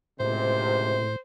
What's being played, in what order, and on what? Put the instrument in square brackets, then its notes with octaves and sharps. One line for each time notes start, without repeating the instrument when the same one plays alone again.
[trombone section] C#2 C3 [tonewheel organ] A2 [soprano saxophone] C5